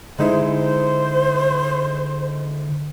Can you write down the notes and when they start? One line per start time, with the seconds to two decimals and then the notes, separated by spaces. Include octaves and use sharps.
0.19 D3 G#3 D#4 E4 C5